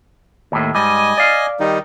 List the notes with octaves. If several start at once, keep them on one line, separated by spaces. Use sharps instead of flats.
D#2 A2
G#2 G3 D#5 G#5
D5 F5
D#3 G3 D#4